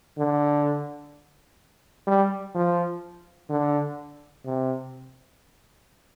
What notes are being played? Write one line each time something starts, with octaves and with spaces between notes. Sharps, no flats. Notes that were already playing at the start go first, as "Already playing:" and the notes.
D3
G3
F3
D3
C3